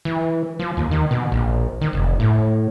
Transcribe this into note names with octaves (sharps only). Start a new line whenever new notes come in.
E3
F3
D#2
D#3
B2
A#1
D#3
F1
A2